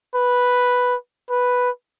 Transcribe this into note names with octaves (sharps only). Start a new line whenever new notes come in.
B4
B4